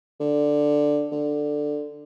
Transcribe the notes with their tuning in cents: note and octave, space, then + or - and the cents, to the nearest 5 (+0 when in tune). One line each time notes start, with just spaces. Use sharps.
D3 +5
D3 +10